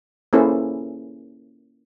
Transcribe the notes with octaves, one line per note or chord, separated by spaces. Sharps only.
A#3 C#4 E4 G#4 A4 C5